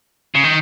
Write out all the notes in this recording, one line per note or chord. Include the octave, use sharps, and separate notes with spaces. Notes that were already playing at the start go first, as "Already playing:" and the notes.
C#3
D#3